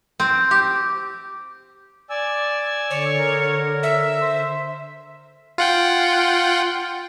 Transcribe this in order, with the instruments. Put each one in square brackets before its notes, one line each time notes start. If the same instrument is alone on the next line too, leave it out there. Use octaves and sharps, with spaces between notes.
[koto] C4
G4
[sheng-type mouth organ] D5 G#5 E6
[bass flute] D3 [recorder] C#5
[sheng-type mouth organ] A#4
[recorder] E5
[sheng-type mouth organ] C5
[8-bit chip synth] F4 F#5 G5